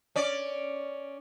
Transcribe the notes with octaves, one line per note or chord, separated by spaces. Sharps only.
C#4 D5